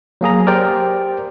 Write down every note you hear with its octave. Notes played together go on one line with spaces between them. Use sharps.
F#3 A#3 G#4 A#5
G4 A#4 C5 D5 G5